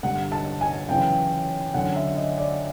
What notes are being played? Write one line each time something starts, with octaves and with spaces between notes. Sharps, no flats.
G2 D3 F#5
A5
G#5
F#2 C#3 E3 G5
F#2 D3 F#5
E5
D#5
D5